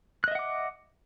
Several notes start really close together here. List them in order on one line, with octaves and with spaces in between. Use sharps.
F#6 D#5 E5 F#5 D6